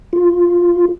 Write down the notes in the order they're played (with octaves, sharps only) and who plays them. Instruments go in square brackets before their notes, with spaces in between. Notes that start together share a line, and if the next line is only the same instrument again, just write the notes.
[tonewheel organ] F4